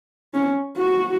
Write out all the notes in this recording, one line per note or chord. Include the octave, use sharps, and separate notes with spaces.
C#4
F#4